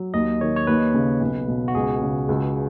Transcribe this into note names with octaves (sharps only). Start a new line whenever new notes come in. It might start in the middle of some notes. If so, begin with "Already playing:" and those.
Already playing: F#3
D#2 D#5
D#3 C#5
C#5
D#2 B4
C#3
B1
B2
F#4
C#2 G#4
C#3
C#2